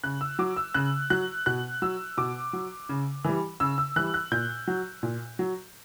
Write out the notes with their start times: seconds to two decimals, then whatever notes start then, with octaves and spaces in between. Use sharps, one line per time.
0.04 C#3 F#6
0.21 E6
0.39 F#3 D6
0.56 E6
0.74 C#3 F#6
1.10 F#3 F#6
1.46 B2 F#6
1.82 F#3 E6
2.17 B2 D6
2.53 F#3
2.89 C#3
3.25 E3 G3
3.60 C#3 E6
3.78 E6
3.96 E3 G3 F#6
4.14 F#6
4.32 A#2 G6
4.67 F#3
5.03 A#2
5.39 F#3